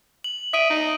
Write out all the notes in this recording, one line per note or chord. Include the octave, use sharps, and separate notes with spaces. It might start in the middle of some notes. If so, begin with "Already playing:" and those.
F#7
E5 D#6 D7 D#7
D#4